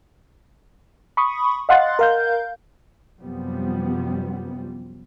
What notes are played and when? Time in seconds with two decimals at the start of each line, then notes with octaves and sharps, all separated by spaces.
1.17 B5 C#6 D#6
1.69 D#5 F5 F#5 C6 F#6 A6
1.99 A#4 F5 G6
3.19 F#2 C3 F3 G3 B3